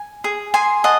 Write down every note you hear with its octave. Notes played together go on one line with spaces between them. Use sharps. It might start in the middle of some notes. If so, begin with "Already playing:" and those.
Already playing: G#5
G#4
G#4 G#5 C6
D#5 F#5 A5